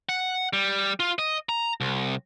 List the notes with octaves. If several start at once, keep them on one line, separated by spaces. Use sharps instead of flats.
F#5
G3
F4
D#5
A#5
C2